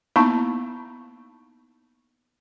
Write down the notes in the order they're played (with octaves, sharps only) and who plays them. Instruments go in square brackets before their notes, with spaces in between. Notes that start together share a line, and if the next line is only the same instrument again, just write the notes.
[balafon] A#3 B3 D#4 E4 A5 C#6